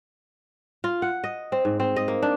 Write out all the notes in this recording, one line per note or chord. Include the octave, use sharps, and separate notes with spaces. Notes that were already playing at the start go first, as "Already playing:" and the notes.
F4
F#5
D#5
C4
G#2
C4
D#5
A#3
D4